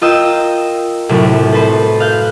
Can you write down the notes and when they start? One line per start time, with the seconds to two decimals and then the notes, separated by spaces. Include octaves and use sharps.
0.02 F4 A#4 D#5 G5 E6
1.09 C2 F#2 A2
1.53 A4 B4 C5
2.00 F5 F#6 G6